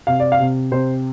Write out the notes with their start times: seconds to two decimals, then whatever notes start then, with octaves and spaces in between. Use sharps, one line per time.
0.07 C3 F5
0.20 D5
0.32 F5
0.40 C3
0.71 C3 C5